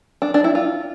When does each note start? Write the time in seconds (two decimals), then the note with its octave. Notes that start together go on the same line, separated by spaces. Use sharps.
0.22 D4
0.34 D4
0.44 E4
0.55 F4